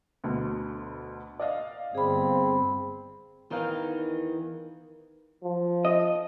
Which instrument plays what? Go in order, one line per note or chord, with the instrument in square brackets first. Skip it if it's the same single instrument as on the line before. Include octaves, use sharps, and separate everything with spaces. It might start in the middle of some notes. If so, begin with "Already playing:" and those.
[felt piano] D2 B2 D3
D5 D#5 F5
[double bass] G1 [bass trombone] C4 [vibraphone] G#4 B5
[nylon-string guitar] E2 D#3 E3 D#4 F5
[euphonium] F3
[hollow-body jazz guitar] D#5